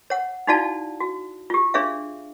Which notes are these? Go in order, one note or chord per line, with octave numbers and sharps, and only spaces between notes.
C#5 F#5
D#4 E4 F#4 D5 F5 A5
F#4
F4 G4
D4 G#4 C#5 E5 F5